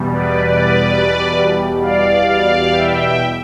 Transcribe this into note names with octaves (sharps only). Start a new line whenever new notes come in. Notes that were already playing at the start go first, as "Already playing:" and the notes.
Already playing: E2 B2 G3
B4 D5
B4 D5
D5 F5
D5 F5
E5 G5